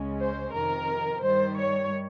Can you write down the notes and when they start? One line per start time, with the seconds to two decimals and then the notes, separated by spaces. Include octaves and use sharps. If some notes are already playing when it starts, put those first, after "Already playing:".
Already playing: C#2 C#3 G#3 C#4
0.20 C5
0.55 F2 C3 D#3 A#4
1.23 G2 D#3 G3 C5
1.58 C#5